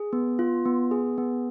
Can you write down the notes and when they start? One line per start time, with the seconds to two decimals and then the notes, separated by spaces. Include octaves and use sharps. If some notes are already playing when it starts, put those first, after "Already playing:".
Already playing: G#4
0.13 B3
0.39 F4
0.65 B3
0.91 G#4
1.18 B3